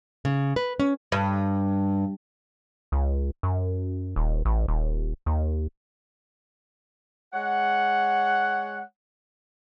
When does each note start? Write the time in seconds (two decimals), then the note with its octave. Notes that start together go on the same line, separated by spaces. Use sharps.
0.25 C#3
0.56 B4
0.80 C#4
1.12 G2
2.92 C#2
3.43 F#2
4.16 D#1
4.45 A1
4.68 D#1
5.26 D#2
7.33 G#3 C#5 F#5